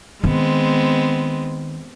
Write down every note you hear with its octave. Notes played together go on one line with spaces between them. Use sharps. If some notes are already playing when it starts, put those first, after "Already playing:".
D#3 G#3 B3 C4